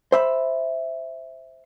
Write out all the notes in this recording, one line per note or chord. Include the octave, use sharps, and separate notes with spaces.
C5 E5 B5